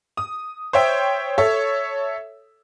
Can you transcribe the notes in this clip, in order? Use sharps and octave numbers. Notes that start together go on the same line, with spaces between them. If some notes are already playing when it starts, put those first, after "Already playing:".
D#6
C5 C#5 E5 G5
A4 C#5 E5